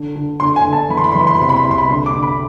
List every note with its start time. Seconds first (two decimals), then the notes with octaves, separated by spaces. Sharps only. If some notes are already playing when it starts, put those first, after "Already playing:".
Already playing: D3
0.16 D3
0.40 D3 C6
0.56 G#5
0.64 D3
0.73 A5
0.89 E3 B5
0.97 C6
1.04 B5
1.12 C6
1.15 E3 B5
1.27 C6
1.35 B5
1.40 C3 C6
1.49 B5
1.56 C6
1.64 C2 B5
1.71 C6
1.78 B5
1.90 D3 C6
2.06 D6
2.15 D3
2.23 B5